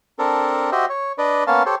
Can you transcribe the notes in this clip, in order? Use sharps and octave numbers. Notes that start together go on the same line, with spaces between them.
C4 D4 A4 A#4
F#4 G4 C5 D#5 E5
C#5
D4 B4 D5 D#5
A#3 B3 C#4 C#5 F5 A5
G4 A4 C5 C#5